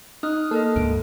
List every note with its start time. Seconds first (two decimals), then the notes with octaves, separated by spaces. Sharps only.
0.23 D#4 D#6 F6 F#6
0.51 A#3 A4 A#4 D#5
0.76 D2 G#2 D7